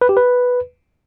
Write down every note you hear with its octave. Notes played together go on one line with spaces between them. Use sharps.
B4
G4
B4